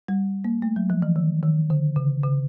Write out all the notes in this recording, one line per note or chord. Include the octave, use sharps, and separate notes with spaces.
G3
A#3
A3
F#3
F3
E3
D#3
D#3
D3
C#3
C#3